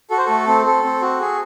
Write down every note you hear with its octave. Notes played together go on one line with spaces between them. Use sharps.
F#4 A4
C5
A3 A4
C4
A4
C4
F#4
G#4